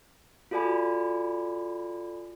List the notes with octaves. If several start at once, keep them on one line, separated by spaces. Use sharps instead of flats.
F4 F#4 A4 D5 G#5 B5